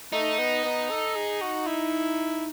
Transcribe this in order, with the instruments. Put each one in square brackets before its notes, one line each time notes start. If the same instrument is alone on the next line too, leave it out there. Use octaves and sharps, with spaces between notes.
[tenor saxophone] A3 [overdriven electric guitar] D#4
[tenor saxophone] B3
B3
A4
G#4
F#4
E4